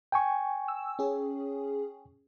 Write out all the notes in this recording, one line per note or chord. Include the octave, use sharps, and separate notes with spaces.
G5 G#5 C#6
E6
C#4 G#4